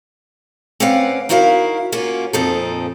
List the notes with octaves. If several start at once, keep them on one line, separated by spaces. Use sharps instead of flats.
C4 C#4 B4 D5 F5 F#5
D#4 E4 F#4 A#4 D#5 F5
A#3 C#4 F4 F#4
F2 A#2 C4 D#4 A4